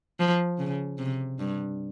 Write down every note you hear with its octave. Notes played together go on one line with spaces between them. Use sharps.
F3
C#3
C3
G2